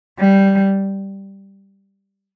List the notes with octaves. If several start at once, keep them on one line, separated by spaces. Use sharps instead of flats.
G3